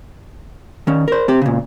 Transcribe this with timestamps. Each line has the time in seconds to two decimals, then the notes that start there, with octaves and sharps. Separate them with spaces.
0.87 D#3 C#4
1.08 A#4 C5
1.28 C4 G4
1.42 A#2 C#3